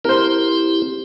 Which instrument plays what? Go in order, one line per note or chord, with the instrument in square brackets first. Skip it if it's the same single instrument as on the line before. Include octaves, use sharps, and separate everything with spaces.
[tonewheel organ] C4 E4 G4 [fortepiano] A#4 C5